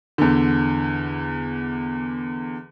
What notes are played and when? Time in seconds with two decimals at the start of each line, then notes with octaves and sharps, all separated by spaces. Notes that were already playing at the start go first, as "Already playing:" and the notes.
0.18 E2 D3